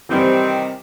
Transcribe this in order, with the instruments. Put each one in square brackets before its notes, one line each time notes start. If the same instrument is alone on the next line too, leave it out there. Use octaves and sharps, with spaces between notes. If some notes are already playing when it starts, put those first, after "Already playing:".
[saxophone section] C3 D#3 C4 [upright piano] E3 G3